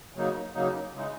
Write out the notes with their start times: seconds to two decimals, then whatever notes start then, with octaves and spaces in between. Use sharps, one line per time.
0.15 C#3 F#3 A#3 D#4
0.54 C#3 F#3 A#3 D#4
0.94 C#3 E3 G#3 D#4